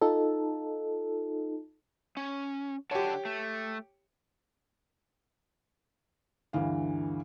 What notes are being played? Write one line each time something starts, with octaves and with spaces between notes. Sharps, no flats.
D#4 F4 A4
C#4
D3 G4 C#5 F#5 A5
A3
D2 G2 E3 F5